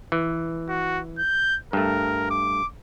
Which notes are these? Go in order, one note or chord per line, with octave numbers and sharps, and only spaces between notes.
E3
F#4
G6
G2 A3 A#4
D6